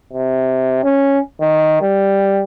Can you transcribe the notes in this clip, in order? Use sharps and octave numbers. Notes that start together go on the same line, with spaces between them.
C3
C#4
D#3
G3